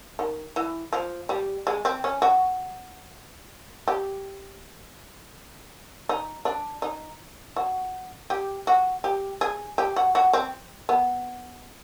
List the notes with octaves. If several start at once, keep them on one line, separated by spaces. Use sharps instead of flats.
D#3
E3
F3
G3
G#3
C4
C#4
F#4
G4
D#4
D4
D#4
F#4
G4
F#4
G4
G#4
G4
F#4
F#4
C4
B3